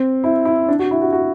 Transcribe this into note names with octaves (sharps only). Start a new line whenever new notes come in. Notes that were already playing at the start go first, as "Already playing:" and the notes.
Already playing: C4
E4
E4
D4
F#4
E4
F#4
F#4